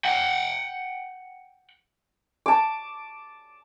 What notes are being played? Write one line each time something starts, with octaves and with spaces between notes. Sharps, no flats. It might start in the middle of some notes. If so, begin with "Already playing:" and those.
F#5 G5
A5 D6